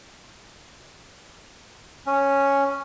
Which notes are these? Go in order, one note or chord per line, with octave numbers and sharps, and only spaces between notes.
C#4